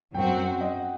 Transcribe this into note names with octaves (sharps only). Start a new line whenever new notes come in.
F#2 F#3 C4 F#4 G5
F#5
D#5